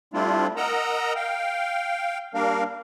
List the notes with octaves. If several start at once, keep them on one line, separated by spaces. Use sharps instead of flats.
G3 A3 C4 D4 E4 F4
A#4 D#5 F#5 A#5 E6
F5 G5
G3 A#3 D4 A#4 F5